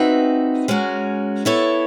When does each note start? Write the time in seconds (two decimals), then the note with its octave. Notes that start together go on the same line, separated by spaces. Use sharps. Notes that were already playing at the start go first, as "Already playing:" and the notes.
Already playing: C4 D#4 F#4 B4 E5
0.68 G#3 C#4 F#4 A#4
1.45 B3 E4 A4 C#5